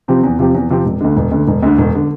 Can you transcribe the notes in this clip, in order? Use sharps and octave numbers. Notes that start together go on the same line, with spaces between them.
C3 F3 C4 G4
E2
C3 F3 C4 G4
E2
C3 F3 C4 G4
E1
D2 D3
E1
D2 D3
E1
D2 D3
E1
D3